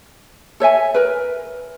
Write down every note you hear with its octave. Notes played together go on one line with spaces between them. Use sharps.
A4 C#5 E5 G#5
A#4 B4